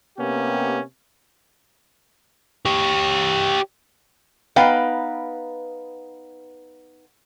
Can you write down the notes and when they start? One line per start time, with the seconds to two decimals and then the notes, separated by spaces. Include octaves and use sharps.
0.17 C3 A#3 B3 C#4 G4
2.66 G4 C#5
4.56 B3 D#4 B4 F5 G5